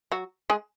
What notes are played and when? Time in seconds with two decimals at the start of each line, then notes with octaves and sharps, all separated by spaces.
0.12 F#3 F#4
0.50 G#3 G#4